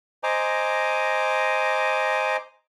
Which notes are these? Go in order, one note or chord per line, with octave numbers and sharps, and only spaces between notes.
C5 D#5 G#5 A#5 D6